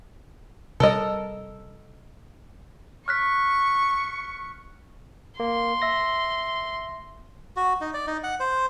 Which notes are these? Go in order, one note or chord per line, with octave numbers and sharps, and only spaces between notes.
C3 G3 A4 A#4 D#5
C#6 F6 F#6 B6
A#3 C6
E5 A#6
F#4
D#4
D5
D#4
F#5
C5